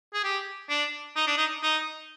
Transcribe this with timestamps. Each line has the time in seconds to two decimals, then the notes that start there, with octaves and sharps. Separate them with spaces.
0.14 G#4
0.24 G4
0.70 D4
1.16 D#4
1.27 D4
1.38 D#4
1.63 D#4